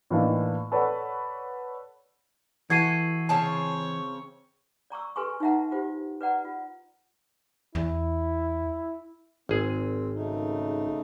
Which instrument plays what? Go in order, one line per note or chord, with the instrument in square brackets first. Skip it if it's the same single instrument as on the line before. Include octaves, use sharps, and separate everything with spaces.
[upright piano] A2 E3 A#3 D4 D#4
A4 B4 C#5 D5 F#5
[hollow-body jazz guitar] E3 [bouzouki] F#4 A4 [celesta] G#6 C7 D#7
[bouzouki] C#3 C4 A5 [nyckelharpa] C#5
[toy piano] D5 A#5 C#6 E6
G#4 A4 B4 G#5 C6 C#6
D#4 F#4 B4 E5 F#5 A#5
F4 G4 C5
B4 D5 F#5 A#5
F4
[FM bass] E2 [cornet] E4
[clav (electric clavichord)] G#1 G#4 [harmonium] C4
[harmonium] C#3 A3 D#4